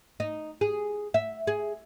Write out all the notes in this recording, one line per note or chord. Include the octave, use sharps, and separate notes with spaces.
D#4
G#4
E5
G#4